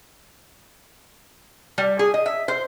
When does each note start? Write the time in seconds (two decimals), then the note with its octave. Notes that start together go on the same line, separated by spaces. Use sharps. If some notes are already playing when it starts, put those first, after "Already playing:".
1.78 G3
1.99 G#4
2.14 D#5
2.26 E5
2.48 C5